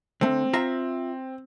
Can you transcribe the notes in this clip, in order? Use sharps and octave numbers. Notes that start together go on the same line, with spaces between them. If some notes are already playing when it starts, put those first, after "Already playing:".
D3 A3 C4
F4 E5 A#5